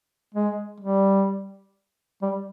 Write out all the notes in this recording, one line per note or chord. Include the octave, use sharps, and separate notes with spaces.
G#3
G3
G3